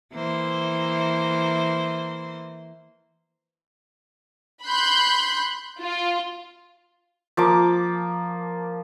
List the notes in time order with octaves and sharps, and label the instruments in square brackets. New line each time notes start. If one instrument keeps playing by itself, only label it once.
[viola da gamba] E3 A#3 C5
[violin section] B5 C6 F#6 G6
F4
[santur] F3 A#3 D6